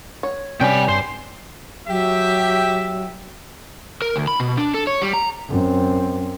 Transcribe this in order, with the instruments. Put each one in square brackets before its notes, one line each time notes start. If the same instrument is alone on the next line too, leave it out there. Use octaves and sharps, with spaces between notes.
[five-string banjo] C#5
[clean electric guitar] C3 [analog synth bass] G3 [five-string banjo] B3 C#4 D4 [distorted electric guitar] G5 B5
[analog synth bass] G2 [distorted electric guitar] C5
[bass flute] F#3 [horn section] G4 E5
[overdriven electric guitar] A#4
D2
B5
B2
D4
A4
C#5
G3
A#5
[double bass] F#2 C4